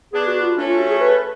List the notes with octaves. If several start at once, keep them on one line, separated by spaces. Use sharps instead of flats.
B3 D4 G#4
F#4
F4
A3 C#4 D4
F4
F#4
G#4
B4